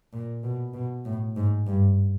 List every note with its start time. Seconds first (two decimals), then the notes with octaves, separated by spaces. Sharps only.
0.13 A#2
0.43 B2
0.74 B2
1.05 A2
1.36 G#2
1.67 G2